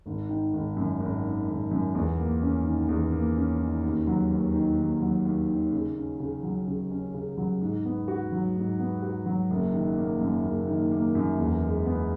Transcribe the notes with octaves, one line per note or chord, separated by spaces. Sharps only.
G#1
D#3
G#1
F#2
G#1
D#3
G#1
F#2
E2
A#3
C#4
D#3
E2
A#3
C#4
D#3
D#2
F#3
D#2
D#3
D#2
F#3
D#2
D#3
C#3
C#4
C#3
F#3
C#3
C#4
C#3
F#3
G#2
B3
F#4
F#3
G#2
B3
F#4
F#3
F#1
D#3
A#3
F#2
F#1
D#3
A#3
F#2
E2
G#3
B3